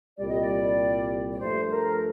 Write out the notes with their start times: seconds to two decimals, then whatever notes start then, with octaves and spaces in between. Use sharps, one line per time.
0.18 C2 A#2 G3 D5
0.29 D#5
0.40 D5
1.32 D5
1.39 G2 F3 A3 C5
1.70 A#4